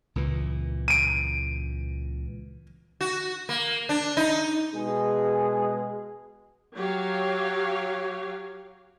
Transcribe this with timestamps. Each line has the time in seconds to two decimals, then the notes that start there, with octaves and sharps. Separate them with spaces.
0.16 C#2 A#2 E3
0.88 D7 D#7
3.01 F#4
3.49 A#3
3.89 D4
4.17 D#4
4.74 B2 G#3 G#4
6.76 F#3 G4 C#5 F5